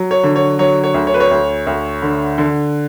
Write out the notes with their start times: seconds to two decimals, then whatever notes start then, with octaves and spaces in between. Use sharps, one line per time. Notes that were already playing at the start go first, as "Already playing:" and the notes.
Already playing: F#3
0.11 C#5
0.23 D3
0.36 C#5
0.59 F#3 C#5
0.84 C#5
0.94 D2
1.07 C#5
1.14 B4
1.20 C#5
1.31 D2
1.67 D2
2.02 D3
2.38 D3